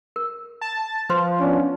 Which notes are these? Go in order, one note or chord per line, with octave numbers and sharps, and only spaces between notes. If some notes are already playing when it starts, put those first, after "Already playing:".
A#4
A5
F3 B4 C5 C6
B3 C#4 D4